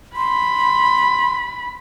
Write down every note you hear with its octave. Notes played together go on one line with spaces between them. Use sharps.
B5 C6